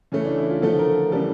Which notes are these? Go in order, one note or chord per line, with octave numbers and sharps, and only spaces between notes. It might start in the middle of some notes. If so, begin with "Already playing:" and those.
C#3 E3 A3 C#4
D4
E4
F4
D3 F3 A3 A4
A#4
C#3 E3 G3 A4